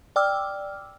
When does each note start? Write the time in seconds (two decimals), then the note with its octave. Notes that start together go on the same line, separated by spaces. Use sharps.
0.16 D5 G5 D6 E6 F6